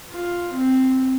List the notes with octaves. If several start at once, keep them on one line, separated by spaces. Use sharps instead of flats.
F4
C4